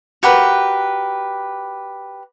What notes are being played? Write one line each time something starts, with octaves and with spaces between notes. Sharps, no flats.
F#4 G4 A#4 B4